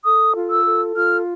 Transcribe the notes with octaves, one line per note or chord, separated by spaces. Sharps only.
A4 D#6
F4
E6
A4
F4 F6